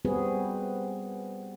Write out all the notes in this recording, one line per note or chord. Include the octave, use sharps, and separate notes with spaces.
G3 B3 C4 F#4 G#4 B4